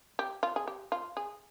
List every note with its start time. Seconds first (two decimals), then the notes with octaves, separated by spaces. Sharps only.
0.19 G4
0.43 F4
0.56 G#4
0.68 G4
0.92 F4
1.17 G#4